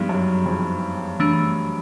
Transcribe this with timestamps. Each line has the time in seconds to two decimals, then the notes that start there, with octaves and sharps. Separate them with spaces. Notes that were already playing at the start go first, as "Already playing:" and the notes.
Already playing: G2 F3 G#3 B3 D#4 G#4
0.09 F#2
0.46 F2
1.20 E3 A3 D4